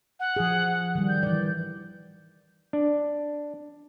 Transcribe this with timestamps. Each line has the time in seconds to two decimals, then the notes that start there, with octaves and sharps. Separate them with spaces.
0.19 F#5
0.36 F3 G#4
0.95 D#3 G3
1.09 G6
1.23 E3 D5
2.73 D4